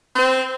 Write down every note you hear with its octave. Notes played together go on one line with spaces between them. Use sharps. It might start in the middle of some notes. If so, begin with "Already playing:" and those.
C4